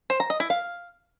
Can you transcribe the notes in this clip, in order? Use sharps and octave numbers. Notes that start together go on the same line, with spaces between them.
C5
A#5
D#5
E4
F5